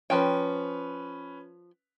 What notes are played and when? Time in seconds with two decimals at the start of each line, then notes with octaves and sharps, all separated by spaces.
0.10 F3 C#4 B4 G5